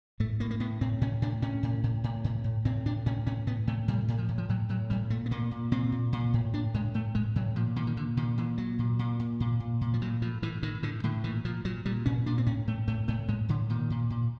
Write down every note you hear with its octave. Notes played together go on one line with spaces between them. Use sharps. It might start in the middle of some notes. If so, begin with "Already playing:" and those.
A2 A3
A2 A#3
A#3
A2 B3
A2 C4
A2 C#4
A2 D4
A2 C#4
A2
A2
A2
A2
A2
A2 C4
A2 D4
A2 C#4
A2 C#4
A2 B3
A2 A3
A2 G3
A2
F3
A2
F3
A2 F#3
A2 F#3
A2 G3
A#2 A3
B3
A#2 A#3
A#2
A#2 C4
A#2
A#2
A2
A2 D4
A2 G#3
A2 A3
A2 G#3
A2 F#3
A#2 F3
A#2 D#3
D#3
A#2 D3
A#2 D#3
A#2 E3
A#2 F#3
A#2
A#2
A#2
A#2
A#2
A#2
F3
A2 F#3
A2 F3
A2 E3
A2 D#3
A2 D3
A2 D3
A#2 E3
A#2 F3
A#2 F#3
A#2 G3
A#2 C#4
A#2 D4
C4
A2 C#4
A2 A3
A2 A3
A2 A3
A2 G#3
A2 D3
A#2 D#3
A#2
A#2